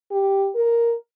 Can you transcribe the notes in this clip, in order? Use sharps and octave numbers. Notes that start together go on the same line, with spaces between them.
G4
A#4